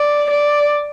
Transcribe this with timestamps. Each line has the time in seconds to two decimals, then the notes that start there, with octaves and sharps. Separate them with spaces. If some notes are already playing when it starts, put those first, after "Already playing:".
Already playing: D5
0.30 D5